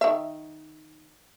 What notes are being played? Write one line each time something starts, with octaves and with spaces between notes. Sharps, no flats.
D#3 E5